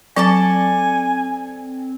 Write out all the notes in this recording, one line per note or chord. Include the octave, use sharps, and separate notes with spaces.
F#3 C4 A4 D5 G#5 A5